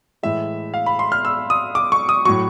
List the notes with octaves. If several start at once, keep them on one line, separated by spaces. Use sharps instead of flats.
A2 E3 G#3 E5
F5
B5
C6
F6
E6
D#6
D6
C#6
D#6
A2 F#3 C#6